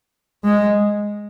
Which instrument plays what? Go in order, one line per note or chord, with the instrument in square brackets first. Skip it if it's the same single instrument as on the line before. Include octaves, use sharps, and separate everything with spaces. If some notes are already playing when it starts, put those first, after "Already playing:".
[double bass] G#3